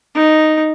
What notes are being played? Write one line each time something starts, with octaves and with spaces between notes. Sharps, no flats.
D#4